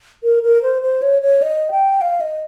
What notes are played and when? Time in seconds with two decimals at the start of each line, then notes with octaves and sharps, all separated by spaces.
0.23 A#4
0.43 A#4
0.63 C5
0.82 C5
1.02 C#5
1.22 C#5
1.42 D#5
1.71 G5
2.01 F5
2.21 D#5